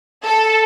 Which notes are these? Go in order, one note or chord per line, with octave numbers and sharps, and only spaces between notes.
A4